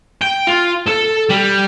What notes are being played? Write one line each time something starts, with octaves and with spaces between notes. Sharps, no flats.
G5
F4
A4
G3